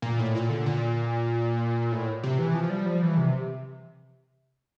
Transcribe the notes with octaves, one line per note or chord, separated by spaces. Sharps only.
A#2
A2
A#2
D3
A#2
A2
C3
E3
F3
G3
F3
E3
C3